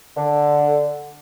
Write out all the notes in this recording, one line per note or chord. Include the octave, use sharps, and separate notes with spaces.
D3